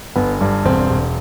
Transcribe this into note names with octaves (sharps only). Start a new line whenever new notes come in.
G1 B3
G2
E1 C4
E1